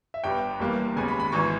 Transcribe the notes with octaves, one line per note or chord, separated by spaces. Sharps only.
E5
G1 G2 G3 B3 G5
G1 G2 E3 G3 A#3
D#2 C#3 G#3 B3 G#5
B5
B5
G#1 G#2 E3 C#6